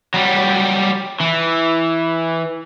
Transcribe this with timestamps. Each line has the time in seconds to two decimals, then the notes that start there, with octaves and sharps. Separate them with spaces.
0.14 F#3 G3
1.20 E3